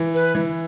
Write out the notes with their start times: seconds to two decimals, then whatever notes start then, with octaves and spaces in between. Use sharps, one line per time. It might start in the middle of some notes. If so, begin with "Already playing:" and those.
Already playing: E3
0.14 B4
0.35 E3